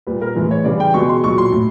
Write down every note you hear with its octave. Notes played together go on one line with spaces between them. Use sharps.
A#2 G3 B4
A#4
A2 E3 G#3 B4
C#5
C#3 E3 G3 D5
G5
B2 G#3 C#6
C6
A#2 F#3 C#6
C6
A2